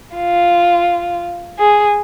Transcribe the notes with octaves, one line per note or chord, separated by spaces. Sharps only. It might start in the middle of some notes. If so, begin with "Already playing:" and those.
F4
G#4